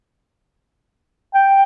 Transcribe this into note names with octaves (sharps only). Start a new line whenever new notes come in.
G5